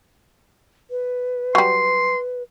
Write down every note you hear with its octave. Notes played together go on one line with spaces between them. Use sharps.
B4
F#3 G3 C6